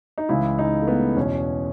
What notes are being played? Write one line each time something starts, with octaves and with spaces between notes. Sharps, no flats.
D#4
C#2 C#3 E3 E4
D#4
A3
B3
E2 B2 C#4